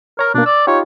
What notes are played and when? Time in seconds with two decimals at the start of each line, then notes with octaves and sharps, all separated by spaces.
0.19 A#4 C#5 A#5
0.34 B2 A#3 D4
0.46 D5 E6
0.67 D#4 F4 G4 C#5